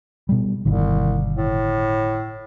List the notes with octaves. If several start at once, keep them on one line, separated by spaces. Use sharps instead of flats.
B2 G3
G1 C2 B2 D#3
A2